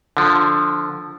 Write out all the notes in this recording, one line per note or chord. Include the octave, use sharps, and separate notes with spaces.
D3 F3